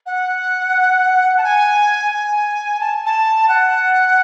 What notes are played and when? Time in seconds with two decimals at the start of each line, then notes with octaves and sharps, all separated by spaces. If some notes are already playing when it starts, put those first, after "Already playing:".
0.06 F#5
1.37 A5
1.44 G#5
2.12 G#5
2.80 A5
3.06 A5
3.49 F#5